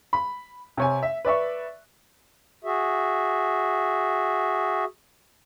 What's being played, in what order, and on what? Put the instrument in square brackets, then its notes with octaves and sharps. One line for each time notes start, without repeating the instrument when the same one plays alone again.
[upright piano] B5
C3 C#5 G#5
E5
B4 D5 E5 C#6
[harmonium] F#4 G#4 E5